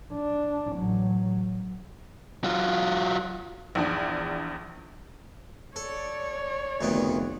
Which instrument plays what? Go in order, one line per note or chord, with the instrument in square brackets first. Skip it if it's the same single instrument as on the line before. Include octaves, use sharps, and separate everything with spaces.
[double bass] D4
A1 F#3
[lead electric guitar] F#3 F4
[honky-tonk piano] A#1 E2 D4
[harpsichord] A4 [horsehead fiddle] C#5 D5
[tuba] F1 [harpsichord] D2 D#3 B3